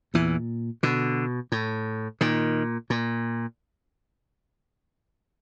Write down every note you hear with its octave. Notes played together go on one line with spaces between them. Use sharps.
E2 A#2 E3
B2 D3
A2
A#2 D#3
A#2